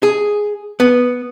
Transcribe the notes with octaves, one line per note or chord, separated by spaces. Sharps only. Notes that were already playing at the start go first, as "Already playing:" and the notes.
G#4
B3